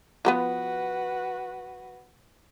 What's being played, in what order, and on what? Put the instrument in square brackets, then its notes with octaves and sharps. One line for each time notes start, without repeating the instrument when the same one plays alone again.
[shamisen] F3 A#3 B3 [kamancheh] F#4 B4